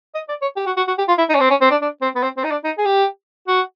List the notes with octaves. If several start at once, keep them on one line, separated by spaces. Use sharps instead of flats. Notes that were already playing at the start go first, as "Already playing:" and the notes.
D#5
D5
C#5
G4
F#4
F#4
F#4
G4
F4
E4
D#4
C#4
C4
C#4
C4
D4
D4
C4
B3
C4
C4
D#4
D4
D#4
G#4
G4
F#4